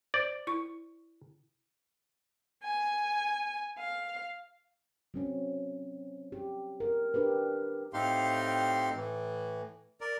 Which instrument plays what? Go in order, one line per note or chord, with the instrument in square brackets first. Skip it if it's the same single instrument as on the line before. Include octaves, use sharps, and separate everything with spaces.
[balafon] C5 [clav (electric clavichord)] D5
[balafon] E4 C#6
[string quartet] G#5
F5
[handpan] F#3 C4 C#4
G4
A#4
D4 G4 A#4 B4
[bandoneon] A2 C4 D#4 G4 F5 C6
A2 E3
A#4 D5